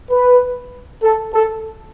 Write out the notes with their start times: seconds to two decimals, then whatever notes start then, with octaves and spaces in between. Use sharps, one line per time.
0.10 B4
1.03 A4
1.34 A4